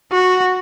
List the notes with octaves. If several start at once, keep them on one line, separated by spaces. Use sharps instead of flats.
F#4